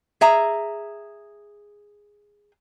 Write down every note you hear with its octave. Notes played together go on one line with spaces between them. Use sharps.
G#4 E5 A#5